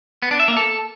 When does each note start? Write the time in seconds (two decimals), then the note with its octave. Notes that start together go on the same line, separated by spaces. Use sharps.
0.22 B3
0.31 D4
0.40 E5
0.48 A#3
0.57 A4